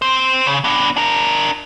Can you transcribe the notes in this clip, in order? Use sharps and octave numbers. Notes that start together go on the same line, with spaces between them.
C4 C5
C#3
B3 D4
D4 A#4